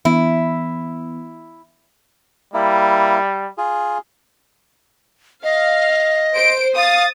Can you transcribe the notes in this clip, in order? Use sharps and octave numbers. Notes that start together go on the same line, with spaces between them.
E3 B3 E4
G3 A#3 E4
F4 G#4
D#5 F5
C5 D7
F5 D#6 A6